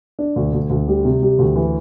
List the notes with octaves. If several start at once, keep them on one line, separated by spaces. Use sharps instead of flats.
D4
D2
D2
D2
G3
C3
G3
D2
E3